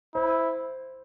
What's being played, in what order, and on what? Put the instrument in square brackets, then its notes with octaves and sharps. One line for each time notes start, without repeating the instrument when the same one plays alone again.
[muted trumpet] E4 [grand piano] C5